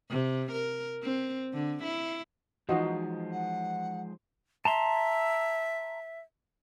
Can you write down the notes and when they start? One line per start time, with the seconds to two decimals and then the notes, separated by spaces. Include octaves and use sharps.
0.10 C3
0.52 A#4
1.03 C4
1.53 D3
1.83 E4
2.69 E3 F3 G#3 D#4 F4 F#4 C5 D#5
3.32 F#5
4.65 E5 A5 A#5 C6